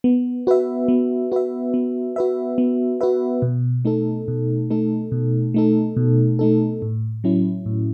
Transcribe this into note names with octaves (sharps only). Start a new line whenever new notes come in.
B3
F#4 B4 E5
B3
F#4 B4 E5
B3
F#4 B4 E5
B3
F#4 B4 E5
B2
A3 D#4 A4
B2
A3 D#4 A4
B2
A3 D#4 A4
B2
A3 D#4 A4
A2
F#3 C#4 E4
A2